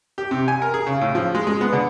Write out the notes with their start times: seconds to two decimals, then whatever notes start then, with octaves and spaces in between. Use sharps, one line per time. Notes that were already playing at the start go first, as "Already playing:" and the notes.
0.18 G4
0.31 C3
0.48 G#5
0.62 A#4
0.74 G#4
0.87 C#3
1.01 A2
1.15 F3
1.35 G#3
1.47 G#3
1.61 B3
1.73 D3